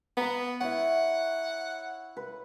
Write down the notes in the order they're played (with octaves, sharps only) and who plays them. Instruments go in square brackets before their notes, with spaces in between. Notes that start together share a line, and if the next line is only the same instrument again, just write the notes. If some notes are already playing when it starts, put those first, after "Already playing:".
[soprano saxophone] B3 [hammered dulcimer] A#5 B5
[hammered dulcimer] E4 C#5 [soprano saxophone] F#5
[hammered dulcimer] B4